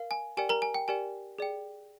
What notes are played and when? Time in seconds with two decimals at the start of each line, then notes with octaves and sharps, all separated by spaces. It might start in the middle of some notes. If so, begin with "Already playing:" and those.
Already playing: A#4 F5
0.11 G#5
0.37 G4 A#4 D5 G5 G#5
0.49 A#4 A#5
0.62 G#5
0.74 G5
0.88 G4 A#4 D5 G5 G#5
1.38 G#4 D5 G5